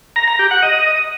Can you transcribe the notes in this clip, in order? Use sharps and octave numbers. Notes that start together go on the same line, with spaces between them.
A#5
A#5
G4
F#5
D#5